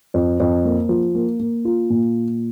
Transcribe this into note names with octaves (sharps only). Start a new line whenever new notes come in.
F2
F2
A#3
F3
A#3
A#3
F4
A#2